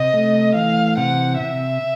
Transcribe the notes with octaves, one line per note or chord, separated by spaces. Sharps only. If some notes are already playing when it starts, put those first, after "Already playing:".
Already playing: C3 D#5
A3
E3 F5
C3 F#5
C3 E5